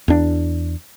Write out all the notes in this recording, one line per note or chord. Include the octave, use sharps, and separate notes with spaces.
E2 D4